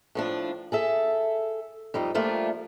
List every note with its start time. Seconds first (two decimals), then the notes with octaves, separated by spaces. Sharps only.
0.15 A2 F3 D4
0.72 G#4 A4 E5
1.94 F2 G3 D#4
2.15 F3 G3 A3 A#3 D4 F4